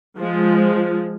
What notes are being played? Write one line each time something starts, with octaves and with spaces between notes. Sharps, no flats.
F3 G#3